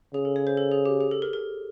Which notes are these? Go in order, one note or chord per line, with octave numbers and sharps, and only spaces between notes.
C#3 G#4
A4
C#5
C5
A4
G#4
G4
G#4
A4
A#4
A#4